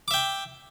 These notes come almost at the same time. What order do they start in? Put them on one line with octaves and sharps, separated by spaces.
D6 E5 G5